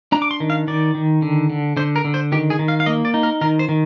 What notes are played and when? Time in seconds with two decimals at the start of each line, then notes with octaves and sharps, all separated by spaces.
0.12 D4 A#5
0.22 D6
0.31 C6
0.40 D#3
0.50 F5
0.68 D#3 D5
0.95 D#3
1.22 D3
1.50 D3
1.77 D3 C5
1.96 A#4
2.04 D3
2.14 C5
2.32 D#3 G4
2.50 G#4
2.59 D#3
2.68 F5
2.80 F5
2.86 A#3 D#5
3.05 D5
3.14 D#4
3.23 A#4
3.41 D#3 A#4
3.59 C5
3.69 D#3